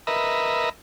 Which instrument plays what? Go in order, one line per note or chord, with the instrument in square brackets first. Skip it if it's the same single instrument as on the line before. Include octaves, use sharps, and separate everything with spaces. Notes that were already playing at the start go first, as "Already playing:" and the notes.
[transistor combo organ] A#4 B4 D#5 E5